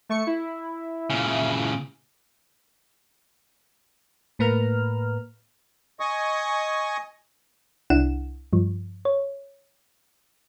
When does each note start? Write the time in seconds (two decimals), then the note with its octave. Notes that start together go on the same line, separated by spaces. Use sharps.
0.09 A3 C#6 C#7
0.27 E4
1.10 A#2 C#3
4.39 A2 A#3 B4 A#5 F6
6.00 D#5 G#5 C#6 D#6
7.90 C2 D4 E4 F#5 E7
8.53 G2 F3
9.05 C#5